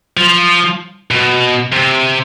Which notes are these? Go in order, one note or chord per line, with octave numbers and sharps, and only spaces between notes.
F3
B2
C3